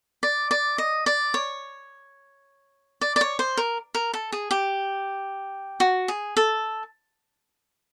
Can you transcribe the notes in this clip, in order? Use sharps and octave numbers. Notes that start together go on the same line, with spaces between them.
D5
D5
D#5
D5
C#5
D5
D5
C#5
C5
A#4
A#4
A4
G#4
G4
F#4
G#4
A4